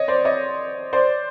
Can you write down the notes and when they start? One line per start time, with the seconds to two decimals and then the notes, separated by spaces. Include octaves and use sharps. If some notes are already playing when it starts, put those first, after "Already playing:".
Already playing: C#5 D#5
0.08 C5 D5
0.25 C#5 D#5
0.93 C5 D5